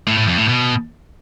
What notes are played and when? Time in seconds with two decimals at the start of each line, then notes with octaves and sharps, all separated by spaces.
0.07 A2
0.17 A2
0.28 F2
0.38 A2
0.48 B2